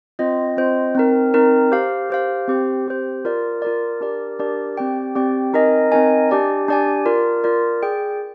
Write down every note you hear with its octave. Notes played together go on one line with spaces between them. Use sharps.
C4 F4 C5 D#5
C4 F4 C5 D#5
C4 D#4 A#4
C4 D#4 A#4
G4 C5 F5
G4 C5 F5
C4 G4 C5
C4 G4 C5
F4 A#4 D5
F4 A#4 D5
D4 G4 A#4 D5
D4 G4 A#4 D5
C4 G4 D5 G5
C4 G4 D5 G5
C4 D#4 A#4 D#5 G#5
C4 D#4 A#4 D#5 G#5
D4 G4 D5 G#5
D4 G4 D5 G#5
F4 A#4 D5
F4 A#4 D5
G#4 D5 G5